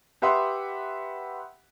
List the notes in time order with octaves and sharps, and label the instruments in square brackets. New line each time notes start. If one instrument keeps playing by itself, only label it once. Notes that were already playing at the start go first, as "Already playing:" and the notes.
[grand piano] G4 B4 E5 F#5 C6 D#6